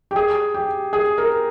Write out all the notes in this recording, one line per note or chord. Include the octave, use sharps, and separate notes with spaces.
G4
G#4
G4
G#4
A#4